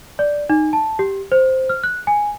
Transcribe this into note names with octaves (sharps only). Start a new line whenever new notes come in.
D5
D#4
A5
G4
C5
F6
F#6
G#5